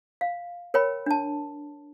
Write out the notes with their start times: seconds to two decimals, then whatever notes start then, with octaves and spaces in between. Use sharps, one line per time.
0.21 F5
0.74 A#4 C#5 G5 B5
1.06 D4 A5